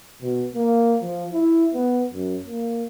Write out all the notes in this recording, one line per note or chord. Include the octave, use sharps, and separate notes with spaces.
B2
A#3
F3
E4
B3
F#2
A#3